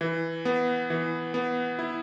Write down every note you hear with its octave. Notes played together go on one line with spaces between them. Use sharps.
E3
B3
E3
B3
E4